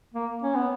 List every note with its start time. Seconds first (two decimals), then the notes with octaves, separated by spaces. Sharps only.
0.14 A#3
0.42 C#4
0.55 B3